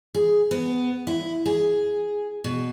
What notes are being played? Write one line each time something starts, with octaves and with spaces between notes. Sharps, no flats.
G#4
B3
E4
G#4
B2